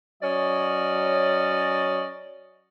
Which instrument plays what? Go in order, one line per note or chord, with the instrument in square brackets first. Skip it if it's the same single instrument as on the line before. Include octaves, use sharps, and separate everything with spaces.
[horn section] F#3 C#4 D5 D#5